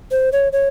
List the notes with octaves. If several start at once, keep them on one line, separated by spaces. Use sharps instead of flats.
C5
C#5
C#5